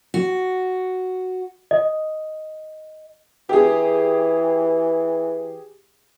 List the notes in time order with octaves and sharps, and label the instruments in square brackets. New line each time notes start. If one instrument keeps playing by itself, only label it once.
[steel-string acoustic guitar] F#4
[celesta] D#5
[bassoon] E3 [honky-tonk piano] G4 G#4